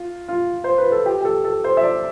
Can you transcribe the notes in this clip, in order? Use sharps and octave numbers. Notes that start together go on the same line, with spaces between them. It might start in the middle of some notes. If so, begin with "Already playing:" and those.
Already playing: F4
F4
C5
B4
A4
G4
G4
A4
A4
C5
E5
D5